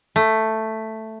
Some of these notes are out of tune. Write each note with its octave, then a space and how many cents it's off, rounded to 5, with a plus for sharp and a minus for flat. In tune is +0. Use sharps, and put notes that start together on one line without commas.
A3 +5